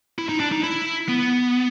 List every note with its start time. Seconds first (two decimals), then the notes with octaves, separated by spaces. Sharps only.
0.19 E4
0.29 D#4
0.40 D4
0.52 D#4
0.63 E4
1.09 B3